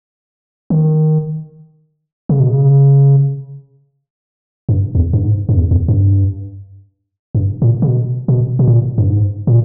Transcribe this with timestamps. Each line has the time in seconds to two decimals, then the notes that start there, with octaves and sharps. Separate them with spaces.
0.70 D#3
2.29 C#3
2.40 B2
2.51 C#3
4.69 G2
4.95 E2
5.13 G2
5.22 G#2
5.49 G2
5.57 E2
5.71 E2
5.88 G2
7.35 G2
7.62 A#2
7.82 C#3
7.87 B2
8.28 B2
8.59 B2
8.67 A#2
8.98 G2
9.08 G#2
9.47 A#2